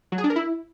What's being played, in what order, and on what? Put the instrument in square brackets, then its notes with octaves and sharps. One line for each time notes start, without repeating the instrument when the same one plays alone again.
[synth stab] F#3
G#4
D4
A#4
E4